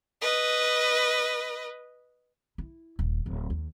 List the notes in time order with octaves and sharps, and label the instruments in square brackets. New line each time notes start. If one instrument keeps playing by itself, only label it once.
[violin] B4 D#5
[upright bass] E4
D#1
D1
D#2